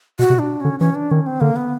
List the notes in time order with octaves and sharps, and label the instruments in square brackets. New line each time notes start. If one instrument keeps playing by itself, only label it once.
[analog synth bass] B2 [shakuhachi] F#4
[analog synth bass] C3
B2
[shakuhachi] D4
[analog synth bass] D3 [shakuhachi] C#4
[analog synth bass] E3 [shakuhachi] C#4
[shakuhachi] D4
[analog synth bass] D#3 [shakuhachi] C#4
[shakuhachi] C4
[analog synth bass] D3 [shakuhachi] A#3
[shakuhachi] B3